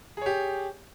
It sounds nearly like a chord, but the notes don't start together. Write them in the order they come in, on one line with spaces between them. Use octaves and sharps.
G#4 C#5 G4